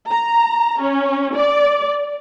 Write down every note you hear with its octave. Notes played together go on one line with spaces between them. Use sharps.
A#5
C#4
D5